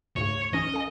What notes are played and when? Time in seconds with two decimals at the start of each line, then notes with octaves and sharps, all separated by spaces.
0.16 D2 G#2 C#3 C#5
0.53 B1 E3 C#4 D#5
0.74 A4 F5 G#5